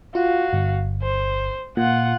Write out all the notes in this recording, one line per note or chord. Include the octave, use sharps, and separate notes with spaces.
F4 F#4 F5
G1
C5
A#2 F4 F#5